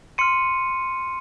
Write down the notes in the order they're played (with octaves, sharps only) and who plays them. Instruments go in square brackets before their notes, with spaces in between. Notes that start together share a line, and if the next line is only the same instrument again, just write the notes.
[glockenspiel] C6 F6 C#7 D#7